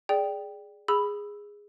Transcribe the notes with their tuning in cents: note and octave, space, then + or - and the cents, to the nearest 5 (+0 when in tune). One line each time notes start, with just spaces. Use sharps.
G#4 +0 D5 +0 G5 +0
G#4 -10 B5 +0 E6 +0